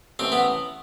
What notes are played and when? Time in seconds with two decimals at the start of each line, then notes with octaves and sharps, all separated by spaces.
0.19 A1 C4
0.32 B3